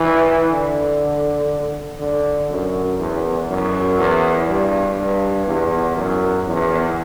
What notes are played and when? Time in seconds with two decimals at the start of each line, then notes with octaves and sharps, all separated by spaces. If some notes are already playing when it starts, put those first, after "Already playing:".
Already playing: E3
0.50 D3
1.99 D3
2.49 F#2
2.98 E2
3.48 F#2
3.97 E2
4.48 G2
4.97 G2
5.47 E2
5.96 F#2
6.47 E2